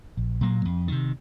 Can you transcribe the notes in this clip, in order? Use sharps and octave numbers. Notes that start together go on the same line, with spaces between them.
A#1
A#2 F#3 A#3
F2
C3 D#3